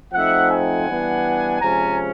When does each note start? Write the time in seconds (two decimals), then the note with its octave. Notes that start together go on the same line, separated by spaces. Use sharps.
0.13 F3 A3 C4 D#4 E5 F#5
0.50 F#5 G#5
0.88 E3 G3 B3 D4
1.60 C3 F3 G#3 C#4 G#5 A#5